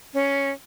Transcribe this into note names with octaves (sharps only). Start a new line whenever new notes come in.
C#4